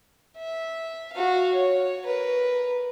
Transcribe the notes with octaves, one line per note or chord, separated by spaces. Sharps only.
E5
F#4 F5
C#5
A#4 B4